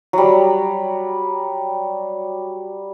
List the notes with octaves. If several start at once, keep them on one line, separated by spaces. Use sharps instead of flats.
F#3 G3